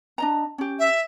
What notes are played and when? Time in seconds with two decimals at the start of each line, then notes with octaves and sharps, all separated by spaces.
0.18 D4 D#5 A#5
0.58 C#4 G4
0.79 E5